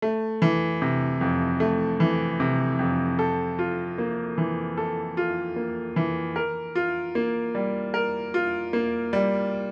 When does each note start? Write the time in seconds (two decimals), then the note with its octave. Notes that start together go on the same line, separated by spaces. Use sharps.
0.02 A3
0.42 E3
0.82 C3
1.21 F2
1.60 A3
2.00 E3
2.40 C3
2.79 F2
3.19 A4
3.59 F4
3.98 A#3
4.38 E3
4.77 A4
5.17 F4
5.56 A#3
5.96 E3
6.36 A#4
6.75 F4
7.15 A#3
7.55 G3
7.94 A#4
8.34 F4
8.73 A#3
9.13 G3